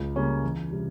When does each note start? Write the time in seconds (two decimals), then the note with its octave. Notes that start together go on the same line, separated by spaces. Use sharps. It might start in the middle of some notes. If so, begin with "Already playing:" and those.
Already playing: C#2
0.16 C#3 G3 A#3 C#4
0.44 E2
0.71 C3 G3